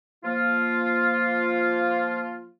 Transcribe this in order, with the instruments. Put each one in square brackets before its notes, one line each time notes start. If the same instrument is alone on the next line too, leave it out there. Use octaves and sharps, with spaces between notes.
[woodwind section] F3 A#3 F4